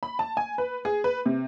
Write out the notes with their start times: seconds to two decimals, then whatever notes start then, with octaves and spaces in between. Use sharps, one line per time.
0.03 B5
0.19 A5
0.37 G#5
0.58 B4
0.85 G#4
1.04 B4
1.26 C3